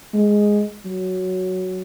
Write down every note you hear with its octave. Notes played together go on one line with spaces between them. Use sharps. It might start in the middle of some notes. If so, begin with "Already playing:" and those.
G#3
F#3